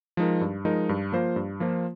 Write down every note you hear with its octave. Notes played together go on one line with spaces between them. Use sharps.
F3 G#3 D#4 A#4
G2
F3 G#3 D#4 A#4
G2
F3 A#3 F4 C5
G2
F3 A#3 F4 C5